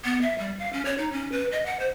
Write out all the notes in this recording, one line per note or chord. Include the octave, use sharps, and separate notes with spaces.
B3
E5
G3
F5
C#4
C#5
D#4
C#4
B4
D#5
F#5
C5